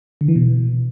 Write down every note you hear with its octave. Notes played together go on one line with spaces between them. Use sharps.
D3
E3
B2